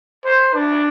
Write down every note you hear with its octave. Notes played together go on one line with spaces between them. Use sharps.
C5
D4